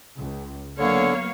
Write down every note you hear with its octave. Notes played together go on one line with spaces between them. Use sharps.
C#2
D3 F#3 A#3 B3 C#5 F5